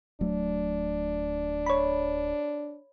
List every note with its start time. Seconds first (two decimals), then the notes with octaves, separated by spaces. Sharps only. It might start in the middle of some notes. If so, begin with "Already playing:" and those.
0.21 D1 F#3 A3 D4
1.66 C#5 B5